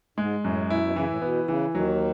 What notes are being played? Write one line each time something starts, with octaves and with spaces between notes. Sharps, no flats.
G#2 G#3
F#2 A2
B2 E4
B2
C#3 E3
A2
B2 B3
C#3 E3
D#2 D#3 F#3